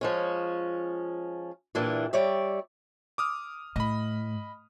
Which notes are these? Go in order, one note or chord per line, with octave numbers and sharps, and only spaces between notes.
F3 G#3 C#4
A#2 E3 G3 D4
G3 C#5 D5 E5
D6 D#6 F6
A2 D#5 B5